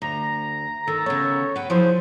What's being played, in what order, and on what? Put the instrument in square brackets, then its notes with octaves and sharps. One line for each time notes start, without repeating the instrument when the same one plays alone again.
[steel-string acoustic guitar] D2 [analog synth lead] A#5
[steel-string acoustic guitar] D#3 [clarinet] A4
[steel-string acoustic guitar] C#3 B3 [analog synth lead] C#5
[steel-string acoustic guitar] B4 G5 [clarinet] F#5
[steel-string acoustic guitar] F3 F#3 G#4 [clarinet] E4 [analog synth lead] C5